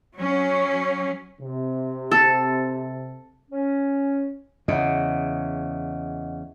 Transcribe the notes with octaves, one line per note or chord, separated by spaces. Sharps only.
F#3 C#4
C3
A4
C#4
E2 C#3 D#5 E5 F#5